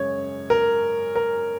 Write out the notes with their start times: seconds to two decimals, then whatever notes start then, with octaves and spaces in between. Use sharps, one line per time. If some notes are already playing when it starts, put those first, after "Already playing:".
Already playing: F#2 C#3 G#3 C#5
0.50 A#4
1.16 A#4